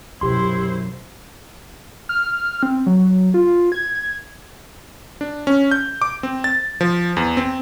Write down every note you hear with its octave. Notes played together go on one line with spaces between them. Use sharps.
C2 F#2 B2 E3 E4 G4 C5 C6
F6
C4
F#3
F4
G#6
D4
C#4
G6
D6
C4
A6
F3
E2
C4